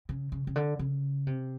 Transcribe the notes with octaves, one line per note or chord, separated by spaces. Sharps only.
C#3
C#3
C#3
D3
C#3
C3